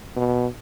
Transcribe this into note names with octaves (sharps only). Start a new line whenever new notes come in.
B2